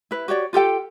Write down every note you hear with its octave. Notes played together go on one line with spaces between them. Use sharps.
E4 B4
F#4 G4 C#5 D5
F4 G4 A4 G5